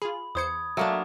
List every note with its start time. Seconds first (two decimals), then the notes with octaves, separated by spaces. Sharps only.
0.02 F4 G#4 B5
0.35 E2 C5 D#6 G#6 C#7
0.77 F#3 A3 A#3 D4